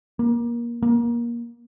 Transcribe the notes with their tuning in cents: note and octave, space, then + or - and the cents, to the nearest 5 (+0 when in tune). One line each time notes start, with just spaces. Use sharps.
A#3 +25
A#3 +20